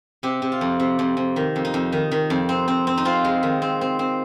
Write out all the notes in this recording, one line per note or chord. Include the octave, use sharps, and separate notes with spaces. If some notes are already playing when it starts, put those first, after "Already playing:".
C3 G4
C3
F4
F2
C3
F2
F2
D#3
F2
D#4
F2
D#3
D#3
F2
C4
C4
C4
D#4
C4 F4
G#3
D#3
C4
C4
C4